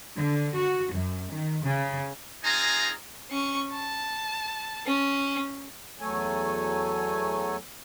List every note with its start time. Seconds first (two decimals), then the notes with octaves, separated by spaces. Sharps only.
0.16 D3
0.53 F#4
0.93 F#2
1.31 D#3
1.64 C#3
2.44 C4 D#4 F4 G#4 G#5 A#5
3.31 C#4 C#6
3.72 A5
4.86 C#4
6.01 E2 F#3 A3 A4 C#5 G#5